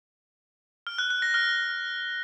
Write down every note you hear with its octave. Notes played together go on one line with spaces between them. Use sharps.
F6
F#6
F#6
A#6
F6